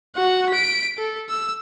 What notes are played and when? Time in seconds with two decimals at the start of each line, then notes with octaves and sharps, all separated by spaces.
0.16 F#4 F#5
0.49 B6 D7
0.98 A4
1.29 E6